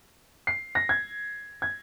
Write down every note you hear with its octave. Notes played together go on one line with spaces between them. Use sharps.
C7
A#6
G#6
G#6